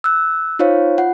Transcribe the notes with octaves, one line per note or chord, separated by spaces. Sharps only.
E6 F#6
D#4 F4 C5 C#5 F5
F4 F#5